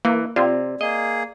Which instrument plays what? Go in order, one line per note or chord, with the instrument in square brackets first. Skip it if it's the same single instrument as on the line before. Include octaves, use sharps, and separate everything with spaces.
[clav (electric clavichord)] E3 [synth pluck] A#3
[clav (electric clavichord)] C3 [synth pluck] C4 F4 [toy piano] D5
[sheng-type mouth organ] A#3 G#4 [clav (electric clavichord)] D#5